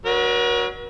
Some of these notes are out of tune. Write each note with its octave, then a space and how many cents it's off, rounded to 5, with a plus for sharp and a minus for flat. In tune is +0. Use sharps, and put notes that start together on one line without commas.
F#3 +0 D4 +15 A#4 +45